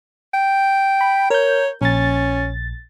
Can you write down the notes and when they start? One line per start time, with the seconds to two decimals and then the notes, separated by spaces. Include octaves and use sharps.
0.33 G5
1.01 B5
1.30 A#4 C#5 G6
1.82 A#1 C#4 A6